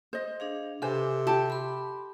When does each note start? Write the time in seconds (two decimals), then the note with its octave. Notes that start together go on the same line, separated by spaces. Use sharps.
0.13 C5 D#5
0.40 D4 G#4 F5
0.82 C3 A4 B4 C5 G#5 D6
1.27 G4 A5
1.50 B5 C6